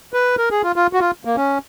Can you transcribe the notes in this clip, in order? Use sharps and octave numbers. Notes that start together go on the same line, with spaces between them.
B4
A#4
G#4
F4
F4
F#4
F4
A#3
C#4